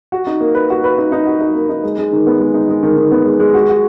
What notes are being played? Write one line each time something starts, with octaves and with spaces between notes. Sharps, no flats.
F#4
D#4
A#3
B4
F#4
B4
D#4
D#4
F#4
D#4
A#3
D#4
G#3
G#3
D#3
B3
G#3
D#4
G#3
D#3
D#3
B3
G#3
G#3
F#4
F#4